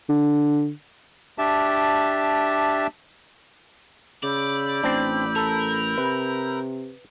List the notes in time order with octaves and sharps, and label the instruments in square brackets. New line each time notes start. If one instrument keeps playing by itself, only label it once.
[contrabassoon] D3
[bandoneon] D4 G4 E5 A5
[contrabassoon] C#3 [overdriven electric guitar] D5 [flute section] B5 E6 G6
[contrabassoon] A1 [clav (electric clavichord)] C4 D4
[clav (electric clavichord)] A4 [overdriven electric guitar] A#4
[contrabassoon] C3 [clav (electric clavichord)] B4